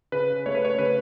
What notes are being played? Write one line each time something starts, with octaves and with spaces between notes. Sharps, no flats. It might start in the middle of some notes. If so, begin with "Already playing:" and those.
C#3 B4
A3 C#5
B4
C#5
C#3 B4